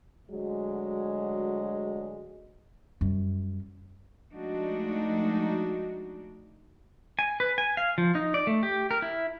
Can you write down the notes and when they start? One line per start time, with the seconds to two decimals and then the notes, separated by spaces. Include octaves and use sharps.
0.29 D2 F#3 G#3
3.01 F#2 G3
4.32 F3 G#3 A3 D4 D#4 F#4
7.19 G#5
7.40 B4
7.58 G#5
7.77 F5
7.98 F3
8.15 D#4
8.34 D5
8.47 A3
8.63 G4
8.91 A#4
9.02 E4